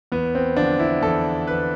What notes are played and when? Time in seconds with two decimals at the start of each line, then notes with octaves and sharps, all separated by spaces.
0.12 E2 B3
0.35 C4
0.57 D3 F3 D4
0.79 E4
1.01 E2 A4
1.47 D3 F3 B4